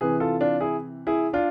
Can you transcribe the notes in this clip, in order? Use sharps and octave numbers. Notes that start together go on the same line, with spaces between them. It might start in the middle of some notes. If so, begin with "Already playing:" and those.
C3 E3 G#4 B4
F4 A4
D4 F4
E4 G#4
E4 G#4
D4 F4